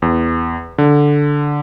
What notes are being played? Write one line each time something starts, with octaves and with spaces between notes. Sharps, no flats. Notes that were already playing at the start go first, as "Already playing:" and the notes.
E2
D3